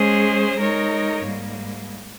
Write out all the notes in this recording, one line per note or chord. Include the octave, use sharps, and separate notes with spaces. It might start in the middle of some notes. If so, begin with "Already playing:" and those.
Already playing: G#3 C#4 G#4 C5
G#3 D#4 A#4 C#5
G#2 G3 A#3